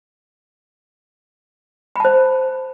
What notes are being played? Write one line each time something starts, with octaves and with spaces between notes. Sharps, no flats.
C5 A5 B5